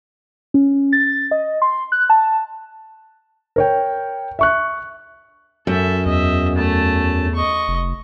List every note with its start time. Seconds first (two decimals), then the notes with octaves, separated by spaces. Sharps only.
0.54 C#4
0.93 A6
1.31 D#5
1.62 C6
1.92 F#6
2.10 A5
3.56 A#4 C#5 G5
4.39 E5 C#6 F#6
5.67 F#2 A4 E5
6.06 E2 D#5 E5
6.55 A3 A5
7.35 D#5 C#6
7.68 F1